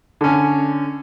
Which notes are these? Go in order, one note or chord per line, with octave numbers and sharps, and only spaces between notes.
D3 C#4